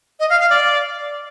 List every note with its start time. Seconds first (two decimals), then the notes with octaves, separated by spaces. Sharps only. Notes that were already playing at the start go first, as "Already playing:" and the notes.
0.20 D#5
0.30 F5
0.40 F5
0.50 D5